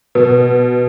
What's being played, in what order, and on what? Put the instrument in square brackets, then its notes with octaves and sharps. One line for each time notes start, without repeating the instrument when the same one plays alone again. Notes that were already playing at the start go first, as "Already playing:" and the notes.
[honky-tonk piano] B2